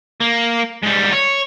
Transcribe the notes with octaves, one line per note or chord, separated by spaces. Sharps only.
A#3
G#2 G3
C#5